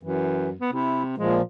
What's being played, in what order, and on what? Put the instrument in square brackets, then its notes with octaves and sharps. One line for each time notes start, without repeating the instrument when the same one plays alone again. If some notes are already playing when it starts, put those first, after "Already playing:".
[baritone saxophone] F#2 [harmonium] E3
[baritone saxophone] B3
[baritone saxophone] C3 [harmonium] E4
[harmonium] A#2 F3 [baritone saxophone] G#3